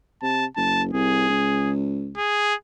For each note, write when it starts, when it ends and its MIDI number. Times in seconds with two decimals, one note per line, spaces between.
0.22 0.46 48
0.22 0.46 81
0.56 0.91 30
0.56 0.83 81
0.93 1.25 36
0.93 1.72 68
1.30 2.17 37
2.17 2.55 68